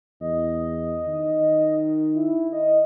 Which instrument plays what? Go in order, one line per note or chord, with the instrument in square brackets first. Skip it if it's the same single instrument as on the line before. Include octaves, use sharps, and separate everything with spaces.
[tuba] E2 [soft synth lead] D#5
[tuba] D#3
[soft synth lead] E4
D#5